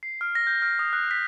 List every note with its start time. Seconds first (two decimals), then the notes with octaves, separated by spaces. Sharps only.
0.03 C7
0.21 F6
0.35 A#6
0.47 G6
0.62 F6
0.79 D#6
0.93 F#6
1.11 B6